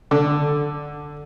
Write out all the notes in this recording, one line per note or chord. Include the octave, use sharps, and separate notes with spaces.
D3